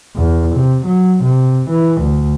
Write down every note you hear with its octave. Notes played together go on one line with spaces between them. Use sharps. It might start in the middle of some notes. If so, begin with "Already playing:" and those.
E2
C3
F#3
C3
E3
D2